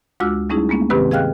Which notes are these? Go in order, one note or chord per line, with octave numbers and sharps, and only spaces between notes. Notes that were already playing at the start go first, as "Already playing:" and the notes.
D2 G#3 F4 F#4 D6 E6
G3 A3 C#4 D#4 E4 G#4
G#3 A#3 B3 C#4
G2 C3 D#3 C4 G4 B4
G#4 D#5 F5 G5 F6 F#6